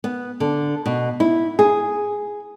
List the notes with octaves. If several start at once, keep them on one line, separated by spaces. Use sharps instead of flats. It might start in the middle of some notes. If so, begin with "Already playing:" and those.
B3
D3
B2
E4
G#4